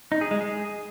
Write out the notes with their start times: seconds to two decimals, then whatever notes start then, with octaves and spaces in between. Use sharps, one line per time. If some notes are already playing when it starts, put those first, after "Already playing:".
0.12 D#4
0.21 G#4
0.31 G#3
0.41 G#4